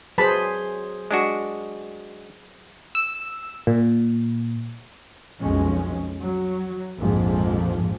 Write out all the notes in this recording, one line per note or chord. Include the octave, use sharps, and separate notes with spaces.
F#3 G#4 B4 C5 A5 B5
G#3 D4 F#4
E6
A#2
B1 F2 G#3 C#4
F#3
A#1 F2 G#2 F3